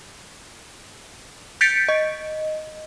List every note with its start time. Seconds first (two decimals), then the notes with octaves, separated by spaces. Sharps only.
1.61 G6 A6 B6 C#7 D7
1.89 D#5